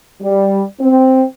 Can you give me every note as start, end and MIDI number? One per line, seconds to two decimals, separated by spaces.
0.22 0.62 55
0.80 1.23 60